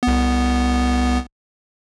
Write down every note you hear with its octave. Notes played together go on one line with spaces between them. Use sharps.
C2 B3